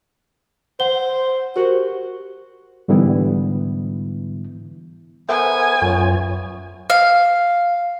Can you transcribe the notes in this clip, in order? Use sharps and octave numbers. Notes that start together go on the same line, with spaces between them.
C5 F#5 G7
F#4 G4 A#4 C5
G#2 D3 E3 G3 B3 E4
B3 A4 A#4 C5 E5 G#5
F#2 F4 C#5
F5